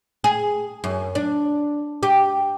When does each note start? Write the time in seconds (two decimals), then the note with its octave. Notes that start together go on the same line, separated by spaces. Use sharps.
0.24 G#4
0.84 F#2
1.15 D4
2.03 G4